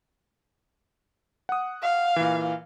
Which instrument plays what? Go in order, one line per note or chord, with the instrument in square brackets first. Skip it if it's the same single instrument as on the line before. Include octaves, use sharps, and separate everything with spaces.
[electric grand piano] F#5 D#6
[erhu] F5
[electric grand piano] A#2 E3